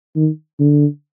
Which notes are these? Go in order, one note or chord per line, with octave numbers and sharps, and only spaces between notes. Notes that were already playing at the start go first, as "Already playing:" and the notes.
D#3
D3